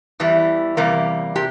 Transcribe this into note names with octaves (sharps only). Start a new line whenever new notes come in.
E2 E3 G3
E2 C3 G3 A#3
C3 G4